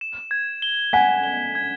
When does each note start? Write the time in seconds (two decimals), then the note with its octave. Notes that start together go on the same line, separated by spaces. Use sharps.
0.01 E7
0.31 G#6
0.62 G7
0.93 F#5 G#5 B6
1.24 G7
1.55 G#6